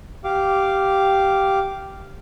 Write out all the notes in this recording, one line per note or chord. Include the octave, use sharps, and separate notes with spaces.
G4 F5 D6